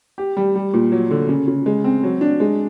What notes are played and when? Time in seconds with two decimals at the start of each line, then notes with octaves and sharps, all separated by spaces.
0.18 G4
0.37 G3
0.56 G3
0.74 A#2
0.92 F#3
1.10 D3
1.29 C#3
1.48 C#3
1.66 G#3
1.84 C4
2.03 F#3
2.21 D4
2.40 G#3